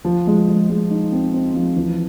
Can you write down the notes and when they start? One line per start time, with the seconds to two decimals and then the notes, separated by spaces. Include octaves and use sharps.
0.05 F3
0.27 G#3
0.48 G#3
0.70 G#3
0.90 D#4
1.12 C4
1.34 C4
1.55 F3
1.77 E3